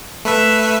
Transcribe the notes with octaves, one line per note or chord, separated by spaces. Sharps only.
A3 B4 E5